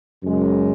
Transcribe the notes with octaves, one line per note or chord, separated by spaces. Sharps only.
F#2 C#3 G#3